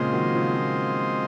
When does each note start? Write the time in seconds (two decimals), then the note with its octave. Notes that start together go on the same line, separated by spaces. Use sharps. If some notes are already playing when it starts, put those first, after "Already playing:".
Already playing: A#2 C#3 G#3 C4 F4 C5 D#5
0.13 D#3 F#3
0.35 C#3 F3
0.55 A#2